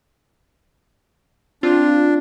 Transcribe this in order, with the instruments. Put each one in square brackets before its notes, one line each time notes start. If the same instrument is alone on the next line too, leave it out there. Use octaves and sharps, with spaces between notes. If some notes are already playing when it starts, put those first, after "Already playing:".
[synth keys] C4 F4 [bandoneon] D4